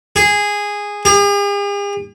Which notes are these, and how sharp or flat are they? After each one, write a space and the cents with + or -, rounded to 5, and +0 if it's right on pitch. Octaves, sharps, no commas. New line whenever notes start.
G#4 -10
G#4 -45